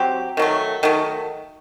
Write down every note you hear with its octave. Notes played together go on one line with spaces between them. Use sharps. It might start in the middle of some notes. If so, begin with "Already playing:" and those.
Already playing: F#3 C4 G4
D#3 F#3 A3
D#3 F#3 A3